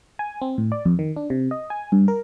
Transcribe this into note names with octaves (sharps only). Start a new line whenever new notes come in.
G#5
C4
A2
D5
F2
D#3
D4
C3
D#5
G#5
G2
A#4